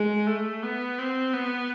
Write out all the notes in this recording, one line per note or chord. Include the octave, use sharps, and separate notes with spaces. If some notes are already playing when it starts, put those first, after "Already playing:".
Already playing: G#3
A3
B3
C4
B3